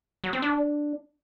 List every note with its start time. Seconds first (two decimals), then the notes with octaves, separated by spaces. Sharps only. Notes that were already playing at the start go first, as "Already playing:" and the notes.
0.24 F#3
0.33 C4
0.42 D4